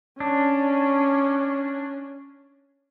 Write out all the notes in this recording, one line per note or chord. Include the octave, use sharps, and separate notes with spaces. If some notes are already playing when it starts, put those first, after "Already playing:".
C#4 D4